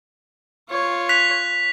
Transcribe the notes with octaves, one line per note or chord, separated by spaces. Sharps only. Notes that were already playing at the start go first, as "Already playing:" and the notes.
F4 C#5
F#6 B6 F7